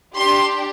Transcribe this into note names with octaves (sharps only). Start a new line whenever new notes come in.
D4 G4 C6